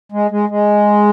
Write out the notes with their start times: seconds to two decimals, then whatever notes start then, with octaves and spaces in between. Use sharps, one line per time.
0.12 G#3
0.31 G#3
0.49 G#3